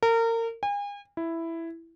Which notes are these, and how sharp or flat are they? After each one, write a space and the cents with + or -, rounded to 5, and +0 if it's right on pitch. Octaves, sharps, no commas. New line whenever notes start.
A#4 -30
G#5 -40
E4 +5